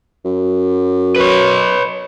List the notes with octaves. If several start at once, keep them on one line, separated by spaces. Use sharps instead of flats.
F#2
B4 C#5